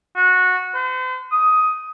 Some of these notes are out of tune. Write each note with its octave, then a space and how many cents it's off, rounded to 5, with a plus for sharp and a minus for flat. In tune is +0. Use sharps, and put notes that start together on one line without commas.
F#4 -15
C5 -40
D#6 +10